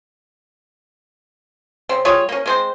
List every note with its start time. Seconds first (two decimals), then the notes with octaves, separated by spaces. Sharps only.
1.89 C#3 C4
2.05 G3 F4 G#4 C#5
2.29 A#3 C#4
2.46 G#3 C4 C5